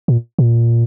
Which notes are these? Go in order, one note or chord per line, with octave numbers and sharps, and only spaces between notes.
A#2
A#2